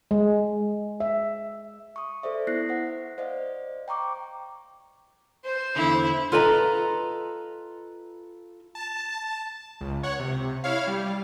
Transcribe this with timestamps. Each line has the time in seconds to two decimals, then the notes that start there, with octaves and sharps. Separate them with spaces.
0.11 G#3
1.00 E5
1.96 C#6 D#6
2.23 A4 C5 D5 E5
2.47 B3 E4 F#6 A#6 C7
2.69 C5 F#5
3.18 C5 D5 D#5 F5
3.88 G5 A#5 C#6 D6
5.45 C5
5.76 E2 D3 E4
6.32 F4 A4 B4 D#5 G#5 A#5
8.75 A5
9.81 C#2
10.03 C#5 F#5
10.19 C3
10.64 E4 C#5 F5
10.87 G3